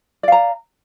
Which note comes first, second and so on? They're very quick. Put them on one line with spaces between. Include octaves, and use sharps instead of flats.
D5 F5 A#5